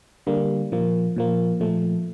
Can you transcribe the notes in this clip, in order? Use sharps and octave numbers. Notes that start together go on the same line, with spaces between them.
D3 G3 A#3
A#2 F3 A#3
A#2 F3 A#3
A#2 F3 A3